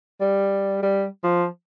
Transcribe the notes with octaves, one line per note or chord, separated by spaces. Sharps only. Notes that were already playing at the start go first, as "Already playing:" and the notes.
G3
G3
F3